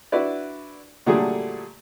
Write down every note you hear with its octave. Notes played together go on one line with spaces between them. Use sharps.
D4 E4 F#4 B4 D5
A#2 D3 F#3 G3 A3 G#4